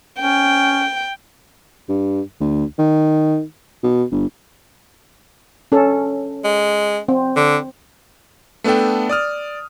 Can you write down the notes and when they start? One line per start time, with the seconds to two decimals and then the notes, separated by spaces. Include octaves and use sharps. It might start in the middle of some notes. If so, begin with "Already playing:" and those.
0.20 C#4 G5
1.89 G2
2.40 D2
2.79 D#3
3.83 B2
4.12 G1
5.72 C#4 A4
6.44 G#3
7.08 C4
7.36 D3
8.64 A3 B3 D4 A4 G5
9.09 D5 D#6 F6